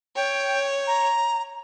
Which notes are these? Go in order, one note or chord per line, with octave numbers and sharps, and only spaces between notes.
C#5 G5
A#5